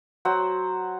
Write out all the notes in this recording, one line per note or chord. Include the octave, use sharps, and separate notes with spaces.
F#3 C5 F#5